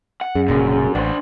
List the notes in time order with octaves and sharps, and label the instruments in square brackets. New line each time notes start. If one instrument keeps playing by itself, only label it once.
[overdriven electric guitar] F#5
[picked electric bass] F#2 [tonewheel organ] C#4 G#4
[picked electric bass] F1 A#2 C#3 [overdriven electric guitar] F#2
[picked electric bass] A1 [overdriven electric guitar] D4 C5